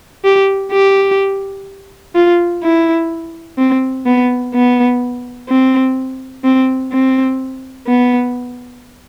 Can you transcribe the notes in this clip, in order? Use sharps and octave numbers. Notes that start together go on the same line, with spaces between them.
G4
G4
F4
E4
C4
B3
B3
C4
C4
C4
B3